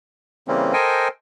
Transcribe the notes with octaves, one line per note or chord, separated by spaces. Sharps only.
C#3 E3 G3 A#3 C4 C#4
A4 A#4 C5 D#5 G5 G#5